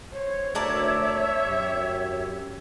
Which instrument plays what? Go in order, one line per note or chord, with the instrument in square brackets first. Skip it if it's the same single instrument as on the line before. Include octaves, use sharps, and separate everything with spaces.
[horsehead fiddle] C5 [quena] C#5
[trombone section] D2 [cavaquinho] A#4 D5 A5 [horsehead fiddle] E5
[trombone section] F#2 G4